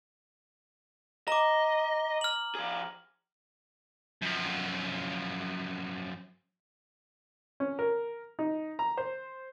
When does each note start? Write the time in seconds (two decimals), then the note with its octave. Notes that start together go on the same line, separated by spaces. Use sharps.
1.28 D#5 A#5 D6
2.21 F6 F#7
2.55 F3 G#4
4.22 F#2 F3
7.60 C#4
7.79 A#4
8.39 D#4
8.79 A#5
8.97 C5